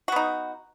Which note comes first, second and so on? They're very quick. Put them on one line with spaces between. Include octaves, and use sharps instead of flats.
F#4 B3 D#4